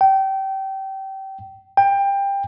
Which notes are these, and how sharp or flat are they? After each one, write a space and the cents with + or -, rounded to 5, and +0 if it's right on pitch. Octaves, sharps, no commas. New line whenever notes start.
G5 -25
G5 +20